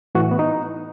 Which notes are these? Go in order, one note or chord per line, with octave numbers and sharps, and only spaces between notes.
A2 E3 F#4
B3
D#4